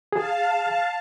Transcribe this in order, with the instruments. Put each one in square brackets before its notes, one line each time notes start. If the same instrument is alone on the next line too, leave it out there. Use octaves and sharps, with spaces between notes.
[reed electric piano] G#4 [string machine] F5 A5